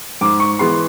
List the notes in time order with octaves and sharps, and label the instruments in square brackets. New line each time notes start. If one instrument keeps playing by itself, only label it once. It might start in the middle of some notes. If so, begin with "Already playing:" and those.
[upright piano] G#2 D6
C#6
E3 G#3 B3 C6